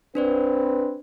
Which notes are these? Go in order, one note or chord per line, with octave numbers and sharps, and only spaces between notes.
C4 D4 B4 C5 D5